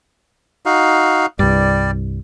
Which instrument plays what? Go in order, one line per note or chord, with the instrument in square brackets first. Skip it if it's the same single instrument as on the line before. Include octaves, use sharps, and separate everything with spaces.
[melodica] D#4 F#4 F5
[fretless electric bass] C2 G2 [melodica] G3 D5